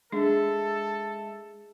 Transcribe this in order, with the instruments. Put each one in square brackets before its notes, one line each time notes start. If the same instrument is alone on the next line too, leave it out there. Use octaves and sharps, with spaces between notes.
[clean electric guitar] G#3 E5 [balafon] D4 [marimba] G#4 [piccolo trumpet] A4